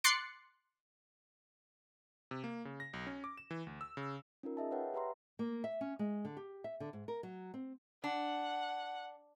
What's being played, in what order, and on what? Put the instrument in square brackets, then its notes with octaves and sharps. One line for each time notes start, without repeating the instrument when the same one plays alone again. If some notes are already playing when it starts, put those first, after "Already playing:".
[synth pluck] C6 D6 F#6 A6 C7 C#7
[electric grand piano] C3
A#3
C#3
A#6
B1
C#4
D6
E7
E3
D2
E6
C#3
[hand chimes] C#4 D#4 F4 A#4
G#4 D#5 E5 A5
B4 C#5 F#5 G5
G4 B4 E5 A#5 C6
[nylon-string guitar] A#3
E5
C#4
G#3
D3
G4
E5
D3
G#2
A#4
F#3
C4
[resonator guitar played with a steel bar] D4 [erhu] F#5